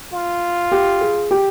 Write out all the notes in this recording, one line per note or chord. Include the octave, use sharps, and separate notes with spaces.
F4
G4
G#4
G4